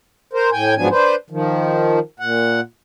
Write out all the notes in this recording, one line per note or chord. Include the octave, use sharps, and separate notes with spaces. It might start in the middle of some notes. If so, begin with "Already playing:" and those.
A#4 C5
A2 G5 G#5
G#2 F3 F#3 B3 D4 G#5
D4 B4 C5
D#3 F3
A#2 F#5